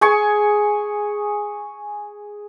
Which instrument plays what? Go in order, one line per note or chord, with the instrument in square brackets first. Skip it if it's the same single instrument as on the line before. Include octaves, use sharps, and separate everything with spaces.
[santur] G#4 G#5 C#6